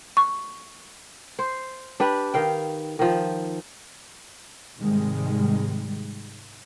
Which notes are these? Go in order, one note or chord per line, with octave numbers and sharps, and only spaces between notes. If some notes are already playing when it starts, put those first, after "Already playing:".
C#6
C5
D4 G4 B4
D#3 F5 G5
D#3 F3
G#2 C3 D#3 G3 G#3